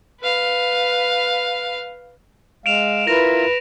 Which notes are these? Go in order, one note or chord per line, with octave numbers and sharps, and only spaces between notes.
B4 F5
G#3 F5 D7 E7 F7
E4 F4 A#4 B4 A#6 F7